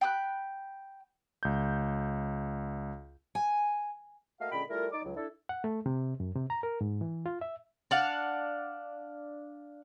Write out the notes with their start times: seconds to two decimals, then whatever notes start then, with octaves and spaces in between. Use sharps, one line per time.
0.01 G5 B5 D#6 F#6
1.43 C#2 G6
3.35 G#5
4.40 A3 A#3 F#4 D#5 F5
4.52 A#2 D3 G#3 C#4 G5 B5
4.69 G3 A3 E4 F4 A#4
4.93 D#4 D5 D6
5.04 C#2 F#3
5.16 D4 E4 A4
5.49 F#5
5.64 A3
5.86 C3
6.20 F#2
6.35 C3
6.50 A#5
6.63 A#4
6.81 G#2
7.01 E3
7.26 F4
7.41 E5
7.91 D4 D5 F5 F#5